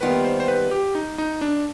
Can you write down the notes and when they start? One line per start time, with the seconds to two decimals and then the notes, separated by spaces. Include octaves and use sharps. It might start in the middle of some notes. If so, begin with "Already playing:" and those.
0.01 D#2 D#3 G3 B3 F4 B4
0.24 C5
0.40 C5
0.48 B4
0.71 G4
0.95 D#4
1.18 D#4
1.41 D4